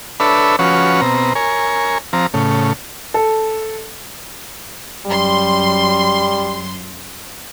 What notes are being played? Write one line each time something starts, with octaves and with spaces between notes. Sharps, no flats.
D4 A4 B4 C#5 E5 B5
F3 C#4 F#4 B4 C#5
B2 C4 A#5
A#4 C#5 G#5
F3 C4 A#5
A2 C#3
A4
F#2 G3 C6